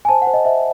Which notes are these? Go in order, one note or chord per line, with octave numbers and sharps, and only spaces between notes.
G#5
C5 A5
F#5
C5
D#5
C5 E5